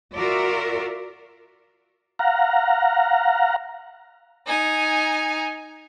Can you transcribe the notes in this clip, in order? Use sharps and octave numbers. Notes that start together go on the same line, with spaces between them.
F4 F#4 A#4 D5 E5
F5 F#5 A#5
D#4 G#5